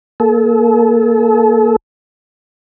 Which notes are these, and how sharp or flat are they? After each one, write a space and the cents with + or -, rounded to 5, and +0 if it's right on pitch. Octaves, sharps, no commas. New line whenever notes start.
A#3 +0 A4 -35